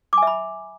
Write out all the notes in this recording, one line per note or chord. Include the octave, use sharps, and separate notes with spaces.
E5 G#5 B5 D6